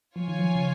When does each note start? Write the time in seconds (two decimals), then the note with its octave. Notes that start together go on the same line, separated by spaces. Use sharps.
0.16 F3 F4 C#5 G#5
0.28 D#3
0.39 F3
0.55 C#3